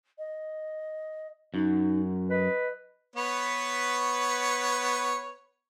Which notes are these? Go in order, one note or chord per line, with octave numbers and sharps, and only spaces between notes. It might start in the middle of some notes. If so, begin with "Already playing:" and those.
D#5
F#2 D#4
B4 D#5
B3 B4 C#5